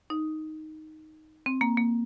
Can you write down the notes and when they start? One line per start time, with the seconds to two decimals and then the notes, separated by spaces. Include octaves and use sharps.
0.10 D#4
1.46 C4
1.61 A#3
1.77 A#3